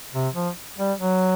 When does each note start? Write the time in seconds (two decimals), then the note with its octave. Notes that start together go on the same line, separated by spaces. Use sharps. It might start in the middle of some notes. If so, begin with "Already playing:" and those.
0.14 C3
0.35 F3
0.78 G3
0.99 F#3